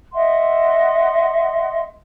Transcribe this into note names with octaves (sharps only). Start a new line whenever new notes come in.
D#5 E5 F#5 C6